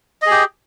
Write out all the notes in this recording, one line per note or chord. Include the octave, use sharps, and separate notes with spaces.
G4 G#4 D#5